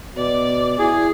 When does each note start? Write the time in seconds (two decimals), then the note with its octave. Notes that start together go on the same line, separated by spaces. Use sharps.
0.16 B2 D5 D6
0.79 E4 G#4